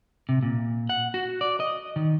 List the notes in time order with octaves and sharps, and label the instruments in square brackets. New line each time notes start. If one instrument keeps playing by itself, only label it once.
[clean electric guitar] C3
A#2
F#5
F#4
D5
D#5
D#3